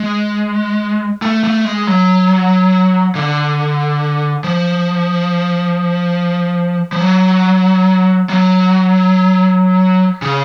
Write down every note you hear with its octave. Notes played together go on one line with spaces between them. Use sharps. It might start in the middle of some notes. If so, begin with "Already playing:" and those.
Already playing: G#3
A3
A3
G#3
F#3
D3
F3
F3
F#3
F#3
C#3